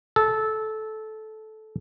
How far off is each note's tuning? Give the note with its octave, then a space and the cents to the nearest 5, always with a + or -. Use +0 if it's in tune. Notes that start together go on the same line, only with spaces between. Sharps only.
A4 -15